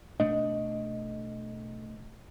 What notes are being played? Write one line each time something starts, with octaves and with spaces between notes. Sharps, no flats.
B2 A3 D4 D#5